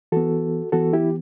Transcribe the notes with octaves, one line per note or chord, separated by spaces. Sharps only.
E3 B3 F#4 A4
E3 B3 F#4 A4
E4 G4